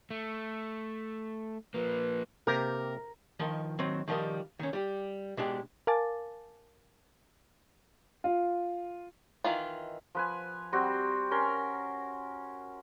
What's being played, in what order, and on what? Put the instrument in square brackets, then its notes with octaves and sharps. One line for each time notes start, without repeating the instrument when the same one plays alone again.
[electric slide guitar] A3
[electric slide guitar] F3 A#3 [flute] B4
[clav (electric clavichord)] C3 A#3 G4 [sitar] A#4
[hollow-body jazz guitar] D#3 F3 A#4 D#5
D#3 F#3 C4
D#3 F3 G3 A#4 D#5
D#3 C#4
G3 G4
B2 G#3 D4 G4
[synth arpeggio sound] A#4 F5 G#5 A5 D6 A6
[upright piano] F4
[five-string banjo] D#3 E3 F4
[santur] F3 B4 G#5
G3 C4 F#4
C#4 A#4 C6